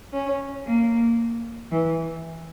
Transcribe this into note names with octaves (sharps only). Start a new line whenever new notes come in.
C#4
A#3
E3